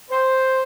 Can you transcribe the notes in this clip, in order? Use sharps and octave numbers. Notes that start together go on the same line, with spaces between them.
C5